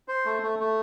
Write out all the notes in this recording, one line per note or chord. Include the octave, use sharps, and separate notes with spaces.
C5
A3
A3
A3